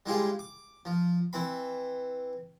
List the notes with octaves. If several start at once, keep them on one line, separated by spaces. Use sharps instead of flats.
G3 G#3 E4 F4 G4 G#4
D6
F3
E3 C4 B5